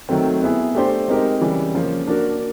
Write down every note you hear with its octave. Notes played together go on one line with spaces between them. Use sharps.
D#3 F#3 A3 C4
B3 E4 G#4
A3 D4 G4 C5
G#3 C4 D#4 G4 A#4
C#3 E3 G3
C#3 F3 A#3
A#3 D4 F#4 A#4